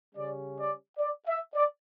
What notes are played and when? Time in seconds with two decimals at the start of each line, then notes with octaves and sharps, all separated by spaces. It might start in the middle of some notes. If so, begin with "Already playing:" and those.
0.15 C#3 G3 C#4 D5
0.57 D5
0.99 D5
1.27 E5
1.55 D5